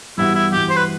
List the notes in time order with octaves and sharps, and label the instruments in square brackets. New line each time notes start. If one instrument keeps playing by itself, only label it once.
[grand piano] G2 E3 B3 F#4 [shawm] E4
[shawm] E4
[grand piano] G2 E3 B3 F#4 [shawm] G4
[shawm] C5
B4